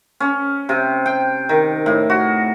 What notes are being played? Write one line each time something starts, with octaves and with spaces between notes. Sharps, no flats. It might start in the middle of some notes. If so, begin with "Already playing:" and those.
C#4
C3
G5
D#3
A2
F#4